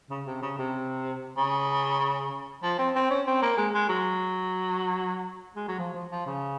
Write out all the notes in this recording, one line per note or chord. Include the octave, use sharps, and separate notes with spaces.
C#3
C3
C#3
C3
C#3
F3
C4
C4
C#4
C4
A#3
G#3
G#3
F#3
G#3
F#3
F3
F3
F3
C#3